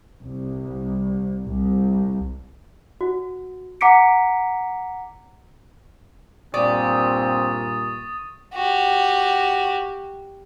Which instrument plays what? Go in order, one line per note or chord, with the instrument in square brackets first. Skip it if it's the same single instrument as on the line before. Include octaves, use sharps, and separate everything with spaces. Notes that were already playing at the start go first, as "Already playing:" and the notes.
[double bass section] C2
C2
[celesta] F#4
F#5 A#5 D6 B6 C#7 D7
[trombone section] G2 A#2 [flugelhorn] C4 [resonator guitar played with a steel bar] D5 [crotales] C#6 D#6 A6
[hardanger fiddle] F#4 G4